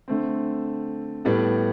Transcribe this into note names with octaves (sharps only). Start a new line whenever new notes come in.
D3 A3 C4
A2 G3 B3